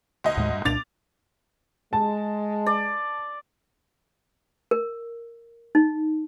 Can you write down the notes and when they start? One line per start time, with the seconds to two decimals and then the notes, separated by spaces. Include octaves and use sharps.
0.24 D2 D#5
0.37 D#2 A2 G#3
0.53 G2
0.65 C2 A#2 D4 D6 A6 F7
1.93 G#3 A5
2.66 D5
4.71 A#4
5.75 D#4